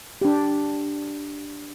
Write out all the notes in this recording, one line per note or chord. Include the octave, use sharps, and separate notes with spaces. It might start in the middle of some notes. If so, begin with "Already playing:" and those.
D4 G4